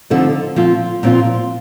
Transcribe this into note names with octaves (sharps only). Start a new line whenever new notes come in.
D3 F3 C4 D#4 A4
A#2 F3 C4 F4
A#2 F3 C4 F4